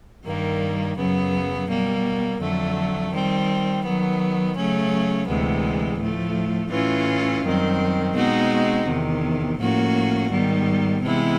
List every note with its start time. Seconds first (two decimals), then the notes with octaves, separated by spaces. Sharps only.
0.24 G2 D#3 G3 A#3
0.96 F#2 C#3 F#3 B3
1.68 B2 G3 A#3
2.40 F2 D3 F#3 A3
3.11 D#3 G3 C4
3.83 D#3 F#3 B3
4.55 C#3 F#3 A3 C#4
5.27 D2 C3 E3 G#3 B3
5.98 A2 F3 A3
6.70 A2 E3 A3 C#4 F4
7.43 F#2 D#3 G3 C4
8.14 B2 G#3 C4 D#4 F#4
8.86 E2 C3 D#3
9.58 A2 F3 A#3 C#4 F#4
10.30 G#2 D#3 G3 B3
11.01 C3 E3 G#3 B3 E4